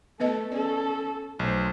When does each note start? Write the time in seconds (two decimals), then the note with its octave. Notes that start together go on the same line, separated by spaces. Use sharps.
0.20 A3 B3 A4 B4 D#5
0.52 C#4 A4 D5
1.39 B1 A3 C5